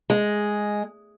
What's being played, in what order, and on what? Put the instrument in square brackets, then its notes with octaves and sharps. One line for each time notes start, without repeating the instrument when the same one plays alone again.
[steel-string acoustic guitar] G#3